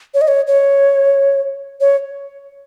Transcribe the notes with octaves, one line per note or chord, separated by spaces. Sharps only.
C#5
D#5
C#5
C#5
C#5